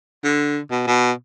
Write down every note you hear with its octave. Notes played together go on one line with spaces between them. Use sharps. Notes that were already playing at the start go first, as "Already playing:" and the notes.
D3
B2
B2